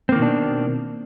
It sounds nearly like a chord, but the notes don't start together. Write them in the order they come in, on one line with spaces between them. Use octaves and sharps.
C4 A#3 D#3 B2 D4